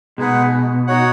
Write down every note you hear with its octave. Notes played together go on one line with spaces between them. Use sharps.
B2 G#3 D#4 G#4 B4 F#5
D#4 F#4 C#5 F#5